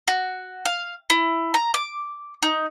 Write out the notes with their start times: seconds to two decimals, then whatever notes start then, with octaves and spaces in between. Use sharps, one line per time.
0.08 F#4
0.65 F5
1.10 E4
1.54 A#5
1.74 D6
2.43 D#4